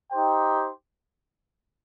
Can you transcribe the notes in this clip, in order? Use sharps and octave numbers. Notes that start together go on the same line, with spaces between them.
D#4 G4 C5 G5